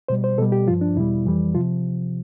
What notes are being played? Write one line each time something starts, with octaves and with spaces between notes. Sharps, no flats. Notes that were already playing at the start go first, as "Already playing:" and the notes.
B2 G3 C5
C5
B2 G3 A4
G4
G2 F3 F4
D4
E2 B2 G3 E4
F2 E3 G3
C3 F3 F4